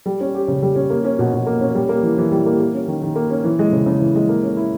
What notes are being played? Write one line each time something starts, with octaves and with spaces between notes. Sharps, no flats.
G3
C#4
G4
C#3
G3
C#4
A#3
C#4
B2
B2
A#3
C#4
G3
A#3
E3
E3
G3
A#3
A#3
C#4
D#3
D#3
A#3
C#4
E3
G#3
C#3
C#3
E3
G#3
A#3
C#4
E4